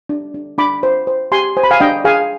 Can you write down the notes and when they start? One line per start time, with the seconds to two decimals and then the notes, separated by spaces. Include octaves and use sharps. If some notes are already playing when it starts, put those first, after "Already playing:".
0.09 D4
0.34 D4
0.58 D4 B5 D6
0.83 C5
1.07 C5
1.32 G4 G#5 C6
1.57 C5 G#5
1.63 B5
1.71 F5 G#5
1.80 D4 D#5 G5
2.05 G#4 F5 G#5